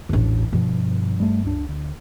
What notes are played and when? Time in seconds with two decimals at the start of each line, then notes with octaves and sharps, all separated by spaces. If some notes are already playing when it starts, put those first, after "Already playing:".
0.09 E1 A1 D4
0.53 G2 B2 F3
1.20 G3 A3
1.44 C#2 D4
1.69 D2